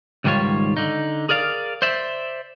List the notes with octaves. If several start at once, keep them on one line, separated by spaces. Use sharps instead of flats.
C#2 G#2 D#3 G3 F4 C#5
D3 D#4
G#4 A#4 D5 F5
C5 D5 E5